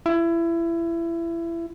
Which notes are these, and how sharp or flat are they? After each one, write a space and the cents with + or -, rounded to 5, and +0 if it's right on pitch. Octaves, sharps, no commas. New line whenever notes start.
E4 +25